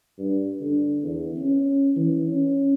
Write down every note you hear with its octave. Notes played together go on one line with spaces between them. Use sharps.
G2
D3
E2
C#4
E3
C#4